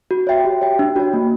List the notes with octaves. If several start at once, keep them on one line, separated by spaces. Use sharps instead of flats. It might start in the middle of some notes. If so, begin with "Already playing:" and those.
F#4
C#5 E5 G5
G4
C#5 G5
D4
F#4 C#5
A#3